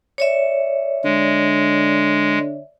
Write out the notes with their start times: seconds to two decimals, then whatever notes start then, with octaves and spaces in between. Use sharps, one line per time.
0.18 C#5 D5 E5
1.04 D3 G#3